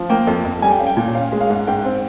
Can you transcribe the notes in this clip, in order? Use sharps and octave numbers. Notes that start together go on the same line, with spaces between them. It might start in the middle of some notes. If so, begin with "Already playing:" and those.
Already playing: F3
A#3 G5
F2
F2
G3 G#5
G5
C#4 F5
G5
A#2
C#4 F5
G#3
F5
G#2
G#2 G5
C4